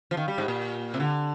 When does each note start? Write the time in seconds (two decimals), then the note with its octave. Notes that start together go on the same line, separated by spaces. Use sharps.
0.11 F3
0.17 D#3
0.28 G3
0.38 G#2
0.48 A#2
0.94 C3
1.00 D3